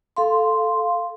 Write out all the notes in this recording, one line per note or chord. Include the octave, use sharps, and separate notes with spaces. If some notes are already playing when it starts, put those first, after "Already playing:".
A4 F5 C6